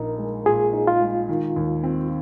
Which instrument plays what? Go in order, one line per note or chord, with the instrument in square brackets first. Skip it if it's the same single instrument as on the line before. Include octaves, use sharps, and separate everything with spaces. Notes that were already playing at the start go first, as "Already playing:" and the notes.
Already playing: [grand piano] A#1 D#4 [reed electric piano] A#4
[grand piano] G#3
[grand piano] A#2 [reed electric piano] G#4
[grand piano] D#4
[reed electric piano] F4
[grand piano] G#3
D#3
D#2
C4